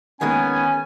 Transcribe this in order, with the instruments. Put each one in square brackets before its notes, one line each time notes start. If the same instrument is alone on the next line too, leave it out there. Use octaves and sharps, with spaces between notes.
[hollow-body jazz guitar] D#3 G#3 A#3 [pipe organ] B3 [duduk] C#4 [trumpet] G#5